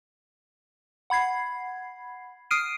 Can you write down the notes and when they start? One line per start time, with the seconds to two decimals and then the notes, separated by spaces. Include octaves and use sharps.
1.10 F#5 B5 G#6 C7
2.51 D#6 F6 C7 D7 D#7